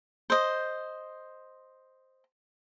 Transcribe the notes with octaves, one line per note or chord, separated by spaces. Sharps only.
C5 D#5